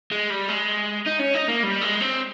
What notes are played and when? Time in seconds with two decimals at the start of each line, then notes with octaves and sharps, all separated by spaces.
0.11 G#3
0.30 G3
0.48 G#3
1.06 D#4
1.19 C#4
1.34 D#4
1.48 A#3
1.63 G3
1.81 G#3
2.01 C4